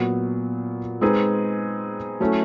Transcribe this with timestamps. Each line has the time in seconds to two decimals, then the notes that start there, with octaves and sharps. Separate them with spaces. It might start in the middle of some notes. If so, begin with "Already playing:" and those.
Already playing: A#2 F#3 B3
1.01 G#3 C4 D#4 G#4 B4
2.20 F#3 A3 C#4 E4 A4